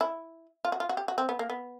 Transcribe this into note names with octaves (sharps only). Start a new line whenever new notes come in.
E4
F4
F#4
F4
F#4
G4
F#4
C4
B3
A#3
B3